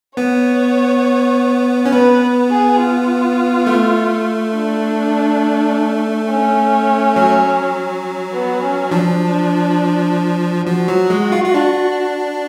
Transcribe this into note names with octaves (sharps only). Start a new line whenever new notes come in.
B3 C#5
C#4
B3 B4
G#4
F4
A3
D4
C#4
F#3
B3
C#4
F3 D4
F3 F#4
F#3
G#3
F4
F4
D4